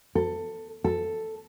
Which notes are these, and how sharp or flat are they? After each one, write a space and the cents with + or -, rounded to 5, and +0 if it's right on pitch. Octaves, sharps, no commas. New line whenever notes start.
A4 +15
A4 +5